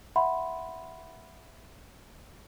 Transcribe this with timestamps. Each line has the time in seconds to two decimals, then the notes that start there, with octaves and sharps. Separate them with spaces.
0.16 E5 F#5 B5 C6